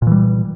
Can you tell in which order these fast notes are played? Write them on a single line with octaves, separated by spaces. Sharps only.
A#2 E3 G3